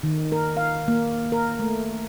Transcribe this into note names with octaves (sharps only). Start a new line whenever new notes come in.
D#3
A#4
F5
A#3
A#4
A3